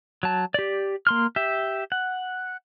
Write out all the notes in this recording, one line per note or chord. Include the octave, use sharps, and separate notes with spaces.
F#3 A5
G4 D5
A#3 C6 F6
G4 E5
F#5